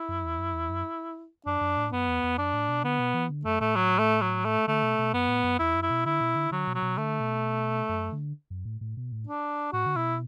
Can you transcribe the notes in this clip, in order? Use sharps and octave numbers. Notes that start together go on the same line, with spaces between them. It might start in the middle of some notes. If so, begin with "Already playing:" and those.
Already playing: E4
F#2
E2
F#2
E2
F#2
F#2 D4
F#2
A2
F#2 B3
E2
E2
F#2 D4
A2
B2
D3 B3
B2
E3
D3
F#2 A3
A2 A3
F#3
A3
F#3
A3
D3 A3
B2
B2
F#2 B3
A2
F#2
E2 E4
F#2
E4
B2
D3 E4
B2
D3
D3 F#3
B2
F#3
B2
D3 A3
B2
F#2
D3
F#2
A2
A2
B2
A2
D4
A2 F#4
D3
B2 E4